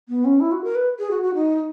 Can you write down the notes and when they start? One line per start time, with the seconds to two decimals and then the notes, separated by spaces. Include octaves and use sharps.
0.09 B3
0.25 C#4
0.40 E4
0.52 F#4
0.64 A#4
0.75 B4
0.99 G#4
1.11 F#4
1.23 F#4
1.35 D#4